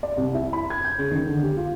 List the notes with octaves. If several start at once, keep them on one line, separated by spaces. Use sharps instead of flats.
D5
C2
E4
B5
G#6
G6
C#3
D#3
D3
G4
F4